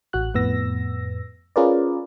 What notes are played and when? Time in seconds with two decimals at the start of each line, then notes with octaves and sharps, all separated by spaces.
0.13 A1 F#4 F#6
0.34 F2 A2 B3 E6 A#6
1.56 C#4 F4 G#4 A#4 B4 D5